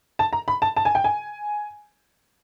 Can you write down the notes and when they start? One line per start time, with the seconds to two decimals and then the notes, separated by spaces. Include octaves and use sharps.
0.19 A5
0.33 A#5
0.48 B5
0.62 A5
0.77 A5
0.85 G#5
0.95 G5
1.04 G#5